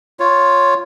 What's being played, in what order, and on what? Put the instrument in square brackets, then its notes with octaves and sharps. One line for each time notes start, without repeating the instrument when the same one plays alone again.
[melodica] F4 C#5